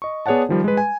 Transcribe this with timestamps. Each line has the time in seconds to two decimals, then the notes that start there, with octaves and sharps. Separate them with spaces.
0.02 D#5 C#6
0.26 B3 G#4 C#5 D5 F#5 A5
0.49 D#3 F3 G3
0.64 G#3 B4
0.77 G#5